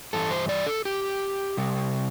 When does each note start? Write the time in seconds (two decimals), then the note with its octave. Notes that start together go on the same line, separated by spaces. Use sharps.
0.13 G2 E3 G3 A4
0.31 C5
0.49 D5
0.67 A4
0.85 G4
1.57 C3 G3